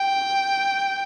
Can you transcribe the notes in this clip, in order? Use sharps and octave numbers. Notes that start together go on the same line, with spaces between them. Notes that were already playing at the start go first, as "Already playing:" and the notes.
Already playing: G5